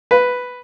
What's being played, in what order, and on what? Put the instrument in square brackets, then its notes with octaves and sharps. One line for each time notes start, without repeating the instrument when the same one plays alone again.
[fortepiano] B4